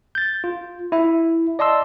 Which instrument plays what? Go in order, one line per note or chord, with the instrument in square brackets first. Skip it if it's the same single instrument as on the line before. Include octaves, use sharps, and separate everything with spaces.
[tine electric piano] G6 A6
F4
E4 E5
D5 D#5 A5 C6 E6